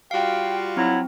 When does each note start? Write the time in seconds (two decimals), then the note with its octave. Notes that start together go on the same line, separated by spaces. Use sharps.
0.11 G3 F4 F#4 F5 G5
0.77 F#3 C4 E4